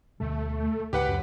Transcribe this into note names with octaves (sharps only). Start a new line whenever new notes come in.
D2 B2 G3 A3
C#2 G#2 G4 B4 F#5
F#2